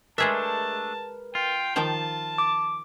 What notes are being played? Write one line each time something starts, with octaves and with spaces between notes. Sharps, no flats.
G#3 A3 D4 G#4 A#4 B4 E5 A5
F4 G5
D#3 F3 G5 A5
D6